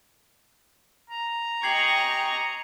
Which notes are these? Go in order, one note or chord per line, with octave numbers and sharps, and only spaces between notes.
A#5
G4 D#5 G5 G#5 C#6 G#6 C7 F#7